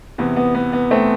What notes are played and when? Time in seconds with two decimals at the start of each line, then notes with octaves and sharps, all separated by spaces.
0.18 E2 C3 E3 B3
0.36 B3
0.55 B3
0.73 B3
0.91 A3 C4